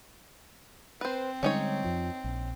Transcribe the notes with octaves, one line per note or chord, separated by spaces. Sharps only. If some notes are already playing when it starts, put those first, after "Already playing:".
C4 B4 C5
D3 G3 G#3 C#4 D#4 C#5
F2 F3
A#1